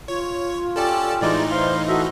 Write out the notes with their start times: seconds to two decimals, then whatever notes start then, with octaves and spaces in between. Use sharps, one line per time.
0.08 F4 C#5
0.76 C#4 G4 A4 D5 A5
1.21 A2 E3 G#3 D#4 D5
1.51 C5 F5 C6
1.88 F#4 A4 D#5 E5